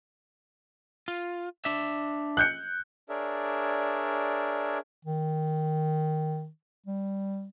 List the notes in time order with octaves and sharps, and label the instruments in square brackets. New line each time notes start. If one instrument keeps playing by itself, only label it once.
[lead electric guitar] F4
D4 E5
[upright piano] F#6 G6 C#7
[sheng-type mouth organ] D4 G#4 A#4 C#5 D5 E5
[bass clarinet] D#3
G3